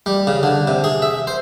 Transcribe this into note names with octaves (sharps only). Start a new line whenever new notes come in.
G3
C#3
D3
C3
G#4
E5
C5